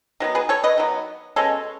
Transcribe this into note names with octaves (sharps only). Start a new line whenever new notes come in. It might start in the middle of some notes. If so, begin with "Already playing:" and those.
D#3 F#3 B3
G#4 B4
A4 C#5
B4 D#5
D#3 F#3 B3
B2 G#3 C#4 A4 C#5